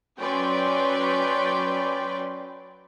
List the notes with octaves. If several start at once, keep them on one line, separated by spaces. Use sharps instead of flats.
F#3 C#4 B4 D5 G5 C6